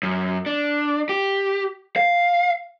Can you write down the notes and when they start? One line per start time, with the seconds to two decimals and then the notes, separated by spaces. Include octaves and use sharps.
0.03 F#2
0.46 D4
1.09 G4
1.96 F5